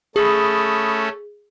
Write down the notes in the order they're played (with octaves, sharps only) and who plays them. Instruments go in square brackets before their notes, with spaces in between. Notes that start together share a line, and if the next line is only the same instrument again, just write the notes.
[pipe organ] A3 C#4 A4 [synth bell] G#4 [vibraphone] B5 D#6